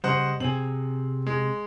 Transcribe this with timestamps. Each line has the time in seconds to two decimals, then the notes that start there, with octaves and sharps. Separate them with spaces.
0.04 C#3 G3 C5 D#5 F#5
0.40 C3 C4 G#4 F#7
1.27 G#3